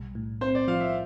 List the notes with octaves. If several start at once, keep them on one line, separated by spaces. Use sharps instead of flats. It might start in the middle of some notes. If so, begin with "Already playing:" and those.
Already playing: B1 G3
A2
C4 C5
D5
F3 F5
E5